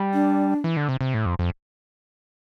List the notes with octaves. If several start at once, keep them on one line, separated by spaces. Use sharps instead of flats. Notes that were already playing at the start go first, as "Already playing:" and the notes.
Already playing: G3
D4
E3
D3
C3
C3
A2
F2
F2